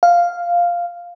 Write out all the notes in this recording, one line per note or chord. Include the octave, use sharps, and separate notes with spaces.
F5